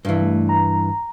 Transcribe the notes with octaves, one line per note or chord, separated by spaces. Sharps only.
G2 E3
A3
A#5